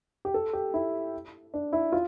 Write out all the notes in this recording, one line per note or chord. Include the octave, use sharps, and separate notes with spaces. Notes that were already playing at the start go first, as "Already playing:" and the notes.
G4
A4
G4
E4
D4
E4
F4